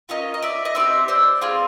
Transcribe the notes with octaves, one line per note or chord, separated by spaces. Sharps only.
A#3 C#4 F4 C#5 D#5
D#5
D5 E5
D#5
C4 D#4 G4 D5 E5
C5 D5
C4 F4 G#4